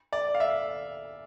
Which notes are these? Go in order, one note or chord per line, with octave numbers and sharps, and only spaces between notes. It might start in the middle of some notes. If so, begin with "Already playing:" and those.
D5
F5
E5